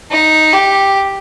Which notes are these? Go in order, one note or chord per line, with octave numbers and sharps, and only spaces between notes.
D#4
G4